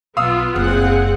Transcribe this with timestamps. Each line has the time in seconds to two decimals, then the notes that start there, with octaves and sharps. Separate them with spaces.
0.17 B1 B3 F4 F5 D#6 E6
0.56 F#1 C4 G#4 F#5